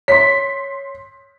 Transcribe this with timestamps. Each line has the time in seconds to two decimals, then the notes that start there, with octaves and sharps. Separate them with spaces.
0.08 C#5 C6 B6